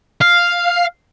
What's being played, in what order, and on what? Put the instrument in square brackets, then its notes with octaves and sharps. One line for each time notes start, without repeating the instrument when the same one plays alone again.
[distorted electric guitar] F5